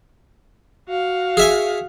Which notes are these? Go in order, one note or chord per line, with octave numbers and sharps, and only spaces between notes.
F#4 F5
G#4 E5 G#5